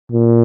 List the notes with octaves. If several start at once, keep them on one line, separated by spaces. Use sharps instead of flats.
A#2